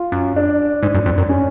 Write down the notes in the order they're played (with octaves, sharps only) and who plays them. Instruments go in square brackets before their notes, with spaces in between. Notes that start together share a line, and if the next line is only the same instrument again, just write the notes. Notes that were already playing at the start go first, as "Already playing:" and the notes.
Already playing: [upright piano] F4
[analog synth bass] F#2
[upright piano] D4
[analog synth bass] G#2
F#2
F2
F#2
[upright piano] C#4